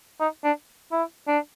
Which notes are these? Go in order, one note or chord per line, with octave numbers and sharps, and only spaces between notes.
D#4
D4
E4
D4